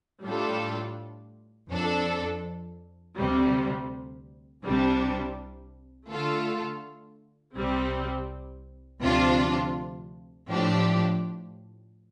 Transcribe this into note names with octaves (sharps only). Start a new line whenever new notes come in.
A2 G3 D4 F4 A4
F2 F3 D4 A4
D2 C3 G3
C2 C3 G3 D4
D3 A3 F4 A4
C2 C3 G3 C4
D2 C3 F3 D4 F4
A2 F3 D4 G4